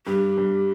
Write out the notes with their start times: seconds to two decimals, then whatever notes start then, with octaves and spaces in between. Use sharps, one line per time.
0.06 G2 G4
0.38 G2